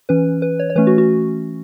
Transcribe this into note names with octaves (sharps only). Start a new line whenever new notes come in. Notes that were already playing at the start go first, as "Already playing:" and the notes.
E3 C#4 B4
B4
C#5
C#5
E3 A3 C#4 B4
F#4
F#4